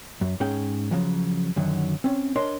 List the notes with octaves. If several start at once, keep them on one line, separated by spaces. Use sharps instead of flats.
F#2
G#2 C#4 G#4 G5
C#3 F3 F#3
F#2 D3 D#3 F#3
C4 C#4
D4 A#4 C#5 D#5 C6